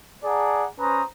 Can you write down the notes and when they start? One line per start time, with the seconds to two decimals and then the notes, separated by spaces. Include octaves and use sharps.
0.25 G#4 D5 F#5 A5 A#5
0.79 C#4 B4 C5 A#5 D#6